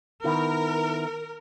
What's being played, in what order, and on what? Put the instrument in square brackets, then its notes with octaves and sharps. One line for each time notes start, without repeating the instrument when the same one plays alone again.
[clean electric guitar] D#3 B3 E4 [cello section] A#4